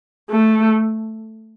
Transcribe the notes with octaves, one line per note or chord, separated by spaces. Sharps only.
A3